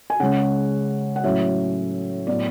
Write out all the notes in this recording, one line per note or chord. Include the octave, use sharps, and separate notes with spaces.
G#5
C#3 G#3 C#4 F#5
F#5
A2 F#3 C#4 E5
A2 F#3 B3 D5